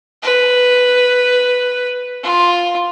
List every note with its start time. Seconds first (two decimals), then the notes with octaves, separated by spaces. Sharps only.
0.23 B4
2.23 F4